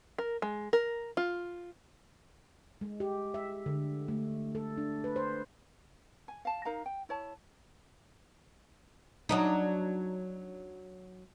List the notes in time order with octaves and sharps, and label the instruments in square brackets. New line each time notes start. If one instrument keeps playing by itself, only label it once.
[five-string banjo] A#4
G#3
A#4
F4
[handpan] G#3
G4
E5
D3
A3
A4
D4
B4
C5
[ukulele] G#5
F5 A5
D#4 A#4 F5 A#5
G5
E4 C#5 A5
[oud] F#3 D4 D#4